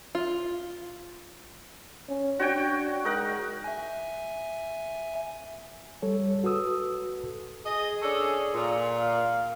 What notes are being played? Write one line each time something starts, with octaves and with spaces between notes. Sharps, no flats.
F4
C#4
D4 F#4 C#5 G5
G#3 D#4 A#4 F#5
E5 G#5
G3 A4 C#5
F#4 A4 B4 D#6 E6
G#4 D#5
C#4 D4 A4
A#2
F5